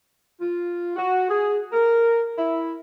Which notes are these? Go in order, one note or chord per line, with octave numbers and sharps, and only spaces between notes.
F4
F#4
G#4
A#4
E4